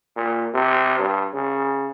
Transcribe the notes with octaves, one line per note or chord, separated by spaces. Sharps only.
A#2
C3
G2
C#3